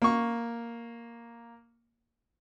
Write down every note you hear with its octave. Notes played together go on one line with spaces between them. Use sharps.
A#3 C#6